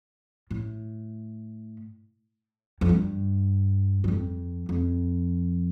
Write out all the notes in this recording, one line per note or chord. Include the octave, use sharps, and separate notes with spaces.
A2
F2
G2
G2
F2
F2